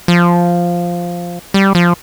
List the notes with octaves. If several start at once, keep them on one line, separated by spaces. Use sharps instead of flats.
F3
G3
F3